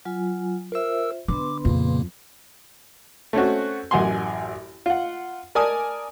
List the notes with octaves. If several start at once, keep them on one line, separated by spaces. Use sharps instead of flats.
F#3 F4 G#5
F4 A#4 C5 E5 E6
D3 B3 B4 C6 D6
F2 A#2 C#3 A#3
A3 C4 C#4 F#4
A1 F#2 F#5 G#5 C6
F4 F#5
A#4 D5 G#5 A5 D#6